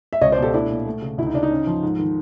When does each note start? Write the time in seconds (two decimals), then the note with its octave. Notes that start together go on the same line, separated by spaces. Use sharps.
0.13 E5
0.21 C#2 C#5 D#5
0.32 C5 D5
0.37 B2
0.42 G4 A4
0.54 A3 D4 E4
0.70 A#2
0.86 A3
1.02 C#3
1.18 D2 E4
1.26 D#4
1.34 C#3 D4
1.43 D#4
1.51 C#4
1.67 F3
1.83 G#2
1.99 D#3